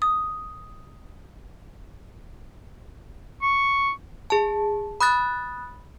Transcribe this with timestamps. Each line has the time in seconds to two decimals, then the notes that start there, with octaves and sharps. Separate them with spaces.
0.02 D#6
3.43 C#6
4.30 G#4 A5
5.01 B5 D#6 F#6 A6